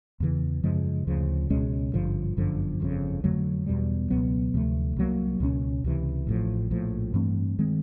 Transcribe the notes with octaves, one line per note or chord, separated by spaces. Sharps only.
E2 C#3 E3
F#2 C#3 F3 G#3
D2 C#3 F3
C#2 B2 G#3 C#4
G#1 G2 D3 F3
G1 F#2 D3 F3
G1 F2 C#3
F2 D3 F#3 A3
E2 B2 G3
C#2 B2 F#3 B3
D2 C3 F3 A3
C2 B2 F#3 A#3
C#2 B2 G#3 C#4
C#2 C3 E3
A1 A2 F3
A#1 A2 F3
G2 E3 A3 C4
D#3 G#3 C4